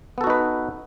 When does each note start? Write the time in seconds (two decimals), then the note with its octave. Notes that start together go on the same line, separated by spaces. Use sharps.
0.18 B3
0.21 A4
0.24 F#4
0.27 D#4
0.30 B4